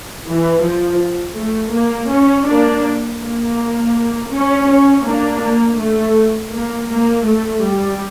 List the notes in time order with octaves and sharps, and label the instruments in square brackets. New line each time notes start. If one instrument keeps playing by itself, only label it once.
[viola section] E3
F3
A3
A#3
C#4
A#3 D4
A#3
C#4
C#4
A#3 D4
A#3
A3
A#3
A#3
A3
G3